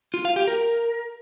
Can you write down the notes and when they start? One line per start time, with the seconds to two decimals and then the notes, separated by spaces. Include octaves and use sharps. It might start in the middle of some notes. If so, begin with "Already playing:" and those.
0.14 F4
0.25 F5
0.36 G4
0.47 A#4